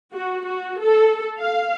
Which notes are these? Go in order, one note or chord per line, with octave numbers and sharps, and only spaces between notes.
F#4
F#4
A4
F5